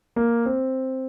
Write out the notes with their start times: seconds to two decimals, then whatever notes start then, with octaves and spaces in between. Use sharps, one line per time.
0.16 A#3
0.46 C4